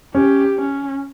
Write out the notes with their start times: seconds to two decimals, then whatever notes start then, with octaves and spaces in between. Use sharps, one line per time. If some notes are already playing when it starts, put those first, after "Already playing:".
0.14 C#4 G4
0.58 C#4